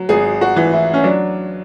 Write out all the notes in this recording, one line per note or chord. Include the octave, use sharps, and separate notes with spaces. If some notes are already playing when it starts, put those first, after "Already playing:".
Already playing: F#3
G#1 G#4
F#4
E3
E4
C#4
F#3 D4